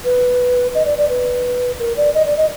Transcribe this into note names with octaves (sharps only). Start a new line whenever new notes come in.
B4
D#5
D5
D5
B4
A#4
D5
D#5
D5
D#5